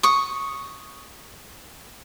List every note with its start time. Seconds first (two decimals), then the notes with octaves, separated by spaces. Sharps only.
0.03 C#6 D#6